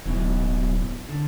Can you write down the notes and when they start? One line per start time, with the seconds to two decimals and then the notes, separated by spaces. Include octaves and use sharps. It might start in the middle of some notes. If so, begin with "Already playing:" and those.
0.05 D1 F#2 B2 E3
1.09 D3